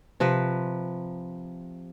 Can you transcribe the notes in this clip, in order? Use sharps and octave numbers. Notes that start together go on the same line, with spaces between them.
C3 F3 B4